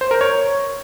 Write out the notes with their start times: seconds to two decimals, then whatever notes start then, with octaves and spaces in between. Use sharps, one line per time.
0.01 C5
0.11 A#4
0.21 C#5